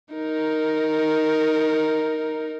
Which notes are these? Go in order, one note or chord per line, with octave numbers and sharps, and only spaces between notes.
D#4 A#4